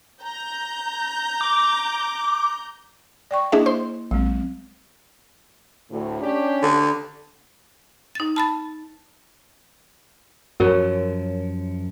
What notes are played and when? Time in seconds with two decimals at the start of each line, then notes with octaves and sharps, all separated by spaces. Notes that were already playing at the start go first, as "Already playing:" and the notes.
0.22 A#5 G6
1.41 D6
3.31 D5 G5 C#6
3.52 A#3 D4 E4 G#4 D#5 E5
3.66 C5 C6
4.11 A#1 F#3 G#3 C4
5.90 D2 A2
6.21 C#4 D4 G4
6.63 D3
8.15 D#4 A6
8.36 A5 B5 A6
10.60 F#2 F3 F#4 A#4 C#5